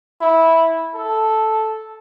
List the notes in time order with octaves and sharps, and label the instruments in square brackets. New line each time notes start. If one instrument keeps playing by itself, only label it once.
[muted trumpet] E4
A4